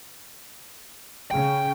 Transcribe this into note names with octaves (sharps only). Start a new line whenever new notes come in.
C#3 G5